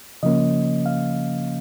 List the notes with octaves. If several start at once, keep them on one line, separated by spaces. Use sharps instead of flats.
C#3 F3 A#3 C#4 D#5
F5